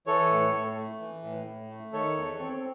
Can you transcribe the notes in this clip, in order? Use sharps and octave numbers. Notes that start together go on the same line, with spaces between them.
E3 A4 C#5
A2
A2
A3
E3
A2
A2
A3
D#3 A4 C#5
E2
C4